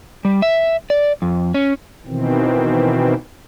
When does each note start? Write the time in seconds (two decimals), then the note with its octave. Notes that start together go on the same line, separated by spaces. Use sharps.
0.25 G3
0.42 E5
0.90 D5
1.22 F2
1.54 C#4
2.06 B2 D#3 E3 C4